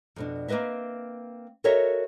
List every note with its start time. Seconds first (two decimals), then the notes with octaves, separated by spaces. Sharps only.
0.16 F2 B2 D4
0.48 A#3 C4 B4 D#5 E5
1.64 F#4 A4 A#4 C#5 D#5 E5